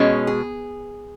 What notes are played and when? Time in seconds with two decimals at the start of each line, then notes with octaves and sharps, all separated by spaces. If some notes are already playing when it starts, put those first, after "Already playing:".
Already playing: B2 G#3 C#4
0.27 G#4